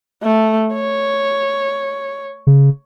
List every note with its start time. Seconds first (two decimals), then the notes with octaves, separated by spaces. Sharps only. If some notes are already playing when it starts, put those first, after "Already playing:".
0.23 A3
0.74 C#5
2.47 C#3